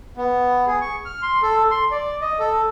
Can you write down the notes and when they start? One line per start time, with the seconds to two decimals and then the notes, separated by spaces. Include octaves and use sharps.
0.17 B3
0.67 G#4
0.81 C#6
1.05 F6
1.22 C6
1.42 A4
1.71 C6
1.91 D5
2.22 D#5
2.39 A4